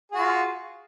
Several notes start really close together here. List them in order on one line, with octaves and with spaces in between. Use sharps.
G#4 F#4 F4